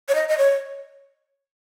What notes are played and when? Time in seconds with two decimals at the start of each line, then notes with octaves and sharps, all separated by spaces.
0.09 C#5
0.15 D#5
0.29 D#5
0.38 C#5